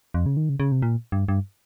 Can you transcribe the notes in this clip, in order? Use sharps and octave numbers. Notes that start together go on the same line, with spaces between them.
F2
C#3
D#3
C#3
C#3
C3
A#2
G2
G2